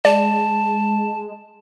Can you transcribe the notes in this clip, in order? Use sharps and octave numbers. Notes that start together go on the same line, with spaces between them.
G#3 D5 A5